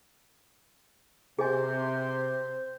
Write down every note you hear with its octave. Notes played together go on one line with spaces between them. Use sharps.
C3 G#4 C5 D#5 G#5